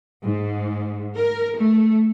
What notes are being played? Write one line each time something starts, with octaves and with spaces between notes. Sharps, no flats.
G#2
A#4
A3